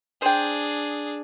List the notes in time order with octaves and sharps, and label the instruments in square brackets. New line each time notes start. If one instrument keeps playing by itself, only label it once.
[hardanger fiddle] D4 G#4 [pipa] C5 G5